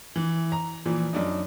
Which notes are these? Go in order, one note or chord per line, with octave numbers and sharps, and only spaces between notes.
E3
A#5
A#2 E3 F3
F#2 D4 D#4